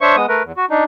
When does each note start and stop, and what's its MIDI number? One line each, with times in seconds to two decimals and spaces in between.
0.01 0.16 62
0.01 0.16 72
0.01 0.16 73
0.01 0.16 76
0.01 0.16 85
0.16 0.26 56
0.16 0.26 59
0.16 0.26 87
0.28 0.43 57
0.28 0.43 70
0.28 0.43 71
0.44 0.52 40
0.57 0.65 66
0.70 0.84 62
0.70 0.84 63